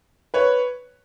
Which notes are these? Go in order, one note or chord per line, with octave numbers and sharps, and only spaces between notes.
B4 C#5